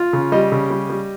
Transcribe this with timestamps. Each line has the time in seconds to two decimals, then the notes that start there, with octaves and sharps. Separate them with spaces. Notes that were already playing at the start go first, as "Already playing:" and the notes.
Already playing: F4
0.13 C#3
0.32 G3 D#5
0.52 C#3
0.70 G3
0.90 G3